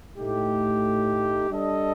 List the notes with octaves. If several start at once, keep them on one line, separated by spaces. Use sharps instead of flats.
A2 A3 D#4 G4
G3 D4 A4 D#5